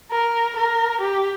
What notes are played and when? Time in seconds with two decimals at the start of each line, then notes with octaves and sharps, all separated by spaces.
0.11 A#4
0.57 A#4
1.01 G4